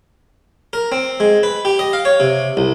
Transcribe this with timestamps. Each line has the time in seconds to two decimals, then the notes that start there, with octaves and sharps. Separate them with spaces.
0.73 A#4
0.92 C4
1.20 G#3
1.43 B4
1.65 G4
1.79 D#5
1.93 F5
2.05 C#5
2.20 C3
2.57 C2